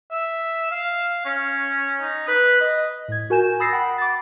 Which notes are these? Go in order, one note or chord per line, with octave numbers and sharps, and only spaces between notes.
E5
F5
C#4
D#4
B4
D#5
A2 G#6
F#4 A#4 G#5 G6 E7
B5 D#6 E6 A6 A#6 C7
F#5 G5 B5 D#6
D6 A6